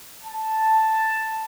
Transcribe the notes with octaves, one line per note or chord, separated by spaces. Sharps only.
A5